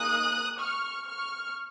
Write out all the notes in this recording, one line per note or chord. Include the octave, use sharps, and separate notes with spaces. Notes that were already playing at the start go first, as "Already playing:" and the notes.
Already playing: A#3 D#4 G#4 D#6 F#6
C#6 F6
C#6 F6